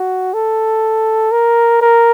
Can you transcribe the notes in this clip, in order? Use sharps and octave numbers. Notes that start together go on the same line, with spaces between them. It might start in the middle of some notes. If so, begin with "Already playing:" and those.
Already playing: F#4
A4
A#4
A#4